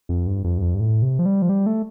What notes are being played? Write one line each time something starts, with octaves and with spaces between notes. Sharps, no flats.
F2
G2
F2
G2
F2
G2
A2
C3
F3
G3
F3
G3
A3